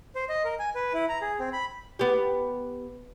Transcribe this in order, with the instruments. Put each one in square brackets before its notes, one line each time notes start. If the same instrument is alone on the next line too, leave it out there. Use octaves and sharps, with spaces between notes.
[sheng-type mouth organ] C5
D#5
A#4
G#5
B4
E4
A#5
G#4
C4
B5
[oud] B3 G4